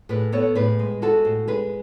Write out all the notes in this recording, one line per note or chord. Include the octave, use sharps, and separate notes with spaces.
A2 G#4 B4
B3 A4 C#5
A2 G#4 B4
G#3
G#3 F#4 A4
A2
G#3 G#4 B4